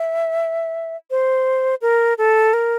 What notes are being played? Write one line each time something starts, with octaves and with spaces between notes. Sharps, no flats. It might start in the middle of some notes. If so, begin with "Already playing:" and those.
Already playing: E5
C5
A#4
A4
A#4